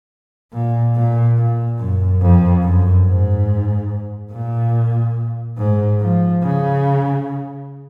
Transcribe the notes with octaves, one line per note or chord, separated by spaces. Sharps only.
A#2
A#2
A#2
F#2
F2
F#2
G#2
A#2
G#2
F3
C#3